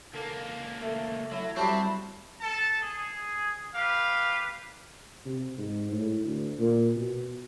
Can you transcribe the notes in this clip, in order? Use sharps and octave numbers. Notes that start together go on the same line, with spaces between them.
C#2 A#3 A4
A3
F#3 A3 E4 E5
F#3 G3 C4 A5 B5
A4 A5
G#4
G4 B4 F5
C3
G#2
A2
D2
A#2
B2